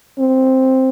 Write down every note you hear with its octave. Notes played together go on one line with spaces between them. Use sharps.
C4